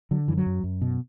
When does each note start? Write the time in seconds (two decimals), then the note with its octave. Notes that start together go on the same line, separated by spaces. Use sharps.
0.11 D3 F#3
0.28 F#2 E3
0.38 F#3
0.46 F#2
0.64 F#2
0.81 B2